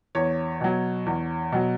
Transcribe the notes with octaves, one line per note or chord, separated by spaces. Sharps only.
E2 C#5
B2 F#3
E2
B2 F#3